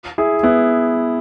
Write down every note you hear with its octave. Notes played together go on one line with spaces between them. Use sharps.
E4 G#4
B3 E4